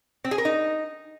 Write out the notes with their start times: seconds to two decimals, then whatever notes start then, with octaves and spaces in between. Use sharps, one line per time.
0.24 C4
0.31 G#4
0.38 A#4
0.45 D#4